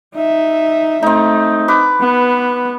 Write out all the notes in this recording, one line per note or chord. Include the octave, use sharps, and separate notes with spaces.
D#4 E5
A3 C4 D#4
B4 D6
B3